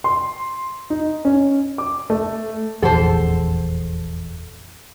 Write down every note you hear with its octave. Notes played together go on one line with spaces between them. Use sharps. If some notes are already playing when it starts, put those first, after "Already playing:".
C6
D#4
C#4
D6
A3
F1 A#1 E2 G#4 A4 C5 F#5 A5